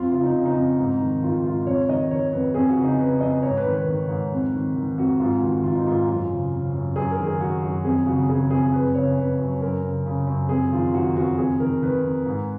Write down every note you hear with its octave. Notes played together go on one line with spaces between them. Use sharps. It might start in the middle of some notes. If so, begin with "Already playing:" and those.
Already playing: F2 F4
C#3 F4
D#4
C#3
D#4
F2
G#2
D#3
D#3 F4
G#2 F4
F2 C#5
D#3 D#5
D#3 C#5
F2 B4
F2 G#4
F#4
C#3
D#4
C#3 B4
F2 D#5
G#2 C#5
B4
D#3
B4
D#3
G#2
F2
D#3
D#3
F2 F#4
G#2 F4
D#3 F#4
D#3 F4
D#4
G#2 F4
F#2 F4
C#3
C#3
F#2
F#2 G#4
A#4
D#3
G#4
D#3 F#4
F#2 F#4
F2 G#4
C#3 F#4
C#3 G#4
F2 G#4
F#2 B4
C#3 C#5
C#3 B4
F#2
F#2 A#4
C#3
C#3
F#2
F2 G#4
D#3 F4
D#3 F#4
F2 F#4
F2 G#4
D#3 A#4
D#3 B4
F2
G#2